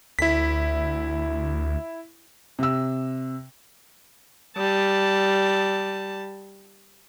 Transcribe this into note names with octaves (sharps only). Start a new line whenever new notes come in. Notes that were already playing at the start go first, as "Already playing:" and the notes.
D2 E4 B6
C3 E6
G3 A5